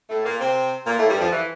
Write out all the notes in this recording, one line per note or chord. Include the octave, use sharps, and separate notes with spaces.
A2 A3
A#2 A#3
C3 C4
A#2 A#3
A2 A3
G2 G3
F2 F3
E3